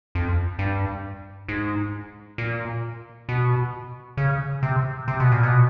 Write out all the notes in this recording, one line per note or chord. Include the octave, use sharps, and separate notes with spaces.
F2
G2
G#2
A#2
B2
C#3
C3
C3
B2
A#2
B2